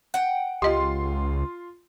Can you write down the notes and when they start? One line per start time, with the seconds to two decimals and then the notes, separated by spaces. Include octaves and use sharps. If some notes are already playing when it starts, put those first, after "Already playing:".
0.14 F#5 G5
0.62 C#2 F4 G4 D#5 C6